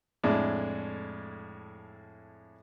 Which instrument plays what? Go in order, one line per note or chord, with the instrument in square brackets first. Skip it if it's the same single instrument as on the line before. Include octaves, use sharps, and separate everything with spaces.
[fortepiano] F2 A2 G#3 D4 E4